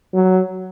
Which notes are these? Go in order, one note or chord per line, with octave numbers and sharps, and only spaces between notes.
F#3